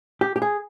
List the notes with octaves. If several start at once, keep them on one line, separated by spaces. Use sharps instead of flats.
G4
G4
G#4